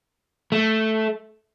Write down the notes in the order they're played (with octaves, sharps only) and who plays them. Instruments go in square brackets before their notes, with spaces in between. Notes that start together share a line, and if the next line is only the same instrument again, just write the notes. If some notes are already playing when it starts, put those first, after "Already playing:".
[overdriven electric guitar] A3